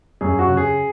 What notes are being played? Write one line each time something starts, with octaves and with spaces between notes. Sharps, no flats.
F#2 G#4
F#4
C#3
G#4